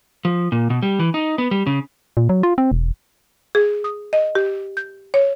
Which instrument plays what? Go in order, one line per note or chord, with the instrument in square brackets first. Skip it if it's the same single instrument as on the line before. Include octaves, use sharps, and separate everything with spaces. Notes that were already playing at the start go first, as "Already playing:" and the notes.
[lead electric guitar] F3
A#2
B2
G3
E3
D#4
B3
G3
C#3
[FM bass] A#2
F#3
F4
C4
E1
[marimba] G#4
D#6
D#5
G4
G6
C#5